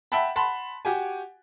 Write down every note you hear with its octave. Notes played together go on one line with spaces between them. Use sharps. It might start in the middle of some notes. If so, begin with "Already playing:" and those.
E5 F#5 G5 A5 B5
F#5 A5 B5 C6
F#4 G4 G#5